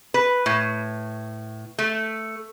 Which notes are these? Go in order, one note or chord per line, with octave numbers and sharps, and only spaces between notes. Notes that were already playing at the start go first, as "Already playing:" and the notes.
B4
A2
A3